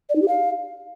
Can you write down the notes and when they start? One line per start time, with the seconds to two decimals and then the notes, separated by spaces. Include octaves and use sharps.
0.09 D5
0.16 D#4
0.22 G4
0.28 F5